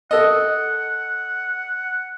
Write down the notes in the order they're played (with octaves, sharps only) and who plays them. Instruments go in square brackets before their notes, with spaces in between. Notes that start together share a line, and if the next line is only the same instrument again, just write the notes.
[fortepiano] A4 D#5 [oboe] F#5